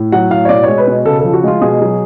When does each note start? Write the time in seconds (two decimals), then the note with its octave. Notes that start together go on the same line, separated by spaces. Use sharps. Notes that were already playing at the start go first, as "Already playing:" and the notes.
Already playing: A2
0.12 F#3 F#5
0.31 A2 F5
0.45 C#5
0.49 B2 D5
0.64 G#3 C#5
0.78 B4
0.88 B2
1.05 C#3 A4
1.19 A4
1.24 F3
1.33 F#4
1.44 G#3 F4
1.61 B2 G#4
1.81 F#3